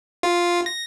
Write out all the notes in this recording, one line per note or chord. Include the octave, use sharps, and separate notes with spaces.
F4
A#6